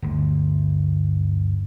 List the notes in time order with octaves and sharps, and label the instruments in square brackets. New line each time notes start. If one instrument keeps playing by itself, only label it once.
[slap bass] G1 D2